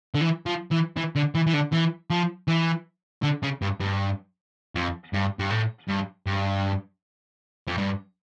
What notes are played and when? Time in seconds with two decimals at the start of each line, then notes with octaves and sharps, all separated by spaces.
0.15 D3
0.21 E3
0.46 F3
0.71 E3
0.97 E3
1.16 D3
1.35 E3
1.47 E3
1.54 D3
1.72 E3
2.10 F3
2.48 E3
3.24 D3
3.43 C#3
3.61 G2
3.80 G2
4.75 F2
5.13 G2
5.39 G2
5.51 A2
5.88 G2
6.26 G2
7.68 F2
7.78 G2